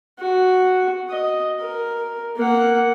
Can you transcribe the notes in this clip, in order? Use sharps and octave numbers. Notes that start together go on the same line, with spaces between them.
F#4
D#5
A#4
A#3 F#5